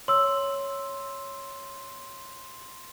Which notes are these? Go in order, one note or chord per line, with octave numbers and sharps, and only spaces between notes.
C#5 C6 E6